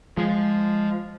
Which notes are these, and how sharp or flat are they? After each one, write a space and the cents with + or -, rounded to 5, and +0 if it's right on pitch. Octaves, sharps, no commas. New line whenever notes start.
F3 +0 G#3 -5